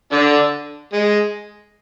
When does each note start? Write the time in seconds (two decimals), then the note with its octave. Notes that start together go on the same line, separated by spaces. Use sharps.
0.12 D3 D4
0.93 G#3